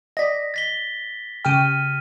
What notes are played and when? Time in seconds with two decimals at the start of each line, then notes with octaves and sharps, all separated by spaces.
0.17 D5 D#5 A#6 B6
0.54 A6 B6 G7
1.45 C#3 G4 G5 F6 D#7